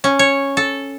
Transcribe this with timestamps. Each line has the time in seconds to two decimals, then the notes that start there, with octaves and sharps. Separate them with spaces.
0.04 C#4
0.19 C#5
0.57 A4